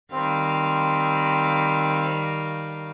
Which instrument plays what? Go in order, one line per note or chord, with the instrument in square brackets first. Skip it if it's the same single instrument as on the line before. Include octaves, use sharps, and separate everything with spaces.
[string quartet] D#3 G3 F5 [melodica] C4